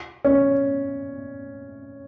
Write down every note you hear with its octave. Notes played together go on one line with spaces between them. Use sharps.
C#4